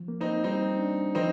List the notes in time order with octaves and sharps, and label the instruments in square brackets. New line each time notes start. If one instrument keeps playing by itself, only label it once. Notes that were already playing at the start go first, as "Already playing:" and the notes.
Already playing: [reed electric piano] F3
A#3
[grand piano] C4 D#4
[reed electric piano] G3 [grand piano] C4 D#4
[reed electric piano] D4
[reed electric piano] F3 [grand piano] C4 D#4